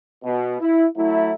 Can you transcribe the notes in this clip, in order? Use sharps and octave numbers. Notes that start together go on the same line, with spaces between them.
B2
E4
F#3 A3 E4